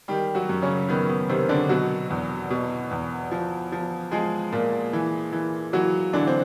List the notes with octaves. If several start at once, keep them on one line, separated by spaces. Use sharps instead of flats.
D#3 G3 G4
F#3 F#4
F#2
C#3 C#4
D#3 B3
B3
C3 D#3 C4
D3 D4
B2 F#3 F#4
E2
B2
E2
F3
F3
F3 G#3 G#4
A#2
E3
E3
E3 F#3 F#4
D3 E3 D4
C4